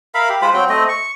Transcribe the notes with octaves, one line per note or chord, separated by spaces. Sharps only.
A#4 E5 F5 B5
G4
G#3 F4 C5 B5
F#3 C4 G5
A3 C4 D#5
C#6